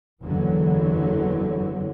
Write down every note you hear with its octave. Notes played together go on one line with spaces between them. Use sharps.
F#1 E2 D3 E3 F#3